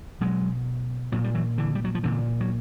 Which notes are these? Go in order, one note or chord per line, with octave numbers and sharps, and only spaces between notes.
B2 F#3 G#3
A#2 F#3
G3
E3 F#3
D3 E3
G3
F#3
F3
A#2 D3 E3
F#3